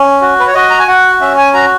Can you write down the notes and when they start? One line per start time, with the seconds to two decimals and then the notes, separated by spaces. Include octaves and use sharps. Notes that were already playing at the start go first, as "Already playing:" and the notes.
Already playing: C#4
0.21 F#4
0.40 B4
0.47 C#5
0.55 F#4 D#5
0.70 A#5
0.79 G#5
0.88 F#4 F#5
1.21 C#4 E5
1.37 G#5
1.54 F#4 A#5